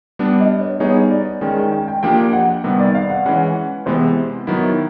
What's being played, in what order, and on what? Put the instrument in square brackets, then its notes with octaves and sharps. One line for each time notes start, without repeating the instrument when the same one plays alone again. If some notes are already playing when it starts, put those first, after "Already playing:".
[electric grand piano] G3 B3 D4
[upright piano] D#5
C#5
[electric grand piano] G3 B3 D#4 G#4 [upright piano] C#5
[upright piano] D5
[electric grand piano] D#3 G#3 C#4 [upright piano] G5
[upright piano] G5
G5
G5
[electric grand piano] F3 A#3 D4 G4 [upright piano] G5
[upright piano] F#5
[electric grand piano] C3 D#3 G3 B3
[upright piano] D5
F5
F#5
[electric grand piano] E3 G#3 C#4 [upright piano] F#5
[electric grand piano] C3 E3 G#3 B3 [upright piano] C5
[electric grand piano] D#3 F#3 B3 E4